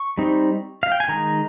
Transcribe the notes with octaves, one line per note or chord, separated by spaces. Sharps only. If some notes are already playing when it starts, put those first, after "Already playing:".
Already playing: C#6
G3 C4 D#4
F5
G5
G#5
D#3 G#3 D#4 A#5